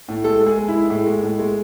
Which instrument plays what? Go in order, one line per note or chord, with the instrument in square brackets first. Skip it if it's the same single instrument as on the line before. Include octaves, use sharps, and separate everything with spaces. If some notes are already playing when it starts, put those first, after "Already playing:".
[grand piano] A2
G#3 A4
G#3
G#4
G#3
E4
G#3
A2
G#3
A2
G#3